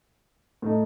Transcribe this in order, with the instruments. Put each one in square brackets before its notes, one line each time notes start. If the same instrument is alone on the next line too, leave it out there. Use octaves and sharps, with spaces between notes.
[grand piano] A2 A3 D#4